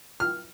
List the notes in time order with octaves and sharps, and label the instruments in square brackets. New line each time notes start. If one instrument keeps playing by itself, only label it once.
[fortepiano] F6